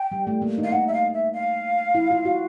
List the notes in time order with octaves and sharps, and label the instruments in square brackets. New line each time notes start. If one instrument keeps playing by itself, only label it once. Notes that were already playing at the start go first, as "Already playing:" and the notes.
Already playing: [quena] G5
[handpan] G3
A3
A#3
D#4
[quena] F5
[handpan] D#4 [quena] F#5
[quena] E5
F5
E5
F5
[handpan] E4
F4
F#4